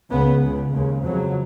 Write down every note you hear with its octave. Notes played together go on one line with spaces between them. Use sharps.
C#2 C#3 B3
C#2 C#3
D#2 C#3 G#3
F2 C#3 F#3